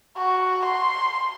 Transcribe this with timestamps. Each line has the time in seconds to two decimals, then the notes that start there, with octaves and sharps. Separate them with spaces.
0.18 F#4
0.65 C6